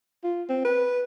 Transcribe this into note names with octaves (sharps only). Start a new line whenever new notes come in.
F4
C4
B4